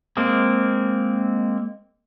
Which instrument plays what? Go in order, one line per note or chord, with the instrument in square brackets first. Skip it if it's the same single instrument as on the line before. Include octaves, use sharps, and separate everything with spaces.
[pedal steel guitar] G#3 A#3 C4